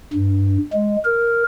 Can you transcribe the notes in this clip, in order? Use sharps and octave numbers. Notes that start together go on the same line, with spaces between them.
G2
G#3
A#4